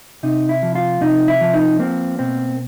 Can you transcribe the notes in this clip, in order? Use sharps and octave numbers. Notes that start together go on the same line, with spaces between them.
C3 D#4
E4
F3
F4
C3 D#4
E4
F3
D#4
A#3 C4
B2 C4